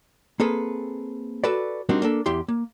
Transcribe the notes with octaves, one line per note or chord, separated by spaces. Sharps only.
A#3 C4 G#4 A4 B4
F#4 A4 B4 D5
G3 C4 D4 D#4 F#4 A#4
A#3 D4 A4
E2 E4 G4 C6
A#3